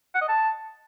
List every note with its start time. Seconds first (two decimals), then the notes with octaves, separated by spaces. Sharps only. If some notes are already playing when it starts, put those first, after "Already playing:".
0.15 F#5
0.21 D#5
0.28 A5